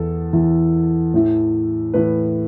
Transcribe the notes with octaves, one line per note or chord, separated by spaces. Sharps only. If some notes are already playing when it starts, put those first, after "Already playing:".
Already playing: E2 E3 A4
E2 E3
A2 E3
A2 E3 B4